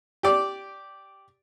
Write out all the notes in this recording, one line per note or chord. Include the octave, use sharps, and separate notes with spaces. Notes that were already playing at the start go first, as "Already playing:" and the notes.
G4 D5